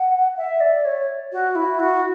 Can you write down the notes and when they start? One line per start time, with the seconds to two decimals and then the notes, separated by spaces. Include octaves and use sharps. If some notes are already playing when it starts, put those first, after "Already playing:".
Already playing: F#5
0.37 E5
0.60 D5
0.85 C#5
1.32 F#4
1.55 E4
1.79 F#4